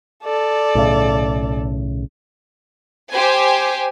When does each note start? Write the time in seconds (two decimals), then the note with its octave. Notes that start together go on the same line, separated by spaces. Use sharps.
0.23 A4 D5
0.75 B1 A2 C#3
3.12 G4 C5 G#5